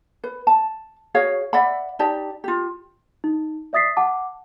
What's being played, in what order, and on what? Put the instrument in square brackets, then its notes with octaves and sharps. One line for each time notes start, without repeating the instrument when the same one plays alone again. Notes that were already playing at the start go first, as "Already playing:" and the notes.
[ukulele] B4
A5
F#4 G#4 C#5 F5
D5 E5 F#5 B5
D#4 G4 D5 A5
F4 G4
[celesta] D#4
D5 E5 D#6 A6 B6 C7
F#5 A5 D6